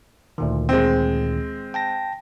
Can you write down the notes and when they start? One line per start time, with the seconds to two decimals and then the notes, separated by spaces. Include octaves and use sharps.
0.38 D2 A#2 D#3
0.69 G#3 C4
1.74 G5 A5 A#6